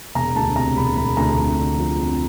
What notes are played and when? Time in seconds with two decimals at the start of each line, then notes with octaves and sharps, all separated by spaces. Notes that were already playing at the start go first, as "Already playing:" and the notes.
0.15 E1 A#5
0.35 D2 A5
0.56 C3 A#5
0.76 E1 B5
0.97 E1 B5
1.17 D2 A#5
1.38 F2
1.58 D3
1.78 F3
1.99 F2